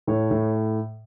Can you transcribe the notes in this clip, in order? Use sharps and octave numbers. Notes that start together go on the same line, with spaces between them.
A2 C#5
A2